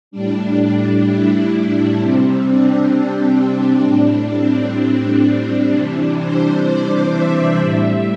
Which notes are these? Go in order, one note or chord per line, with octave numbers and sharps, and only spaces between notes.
A2 G3 D4
E4
D4
C3 G3 C4
D4
C4
A2 G3 D4
C4
C4
D4
C3 E3 G3
C5
D5
E5
A2 G3